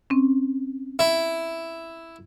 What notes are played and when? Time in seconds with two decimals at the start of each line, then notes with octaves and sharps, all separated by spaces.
0.10 C4 C#4
0.99 E4